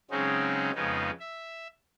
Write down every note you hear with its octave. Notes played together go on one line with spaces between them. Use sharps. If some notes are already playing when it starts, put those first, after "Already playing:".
C#3 F#3 G#3 C4 C#4 D#4
F2 C#3 G#3 B3 D#4
E5